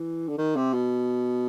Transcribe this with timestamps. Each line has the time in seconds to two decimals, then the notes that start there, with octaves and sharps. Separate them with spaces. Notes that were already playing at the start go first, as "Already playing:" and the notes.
Already playing: E3
0.28 D3
0.38 D#3
0.56 C3
0.73 B2